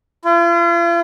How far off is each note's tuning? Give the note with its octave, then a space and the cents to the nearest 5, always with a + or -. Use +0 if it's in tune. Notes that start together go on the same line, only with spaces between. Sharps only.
F4 -45